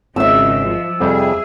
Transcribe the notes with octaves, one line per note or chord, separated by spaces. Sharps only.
G#1 C#3 D#4 F4 E5 E6
F3
F2 C3 G3 G#4